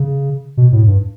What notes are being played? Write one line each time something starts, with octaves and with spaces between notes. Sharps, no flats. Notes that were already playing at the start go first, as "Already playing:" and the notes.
Already playing: C#3
B2
A2
G2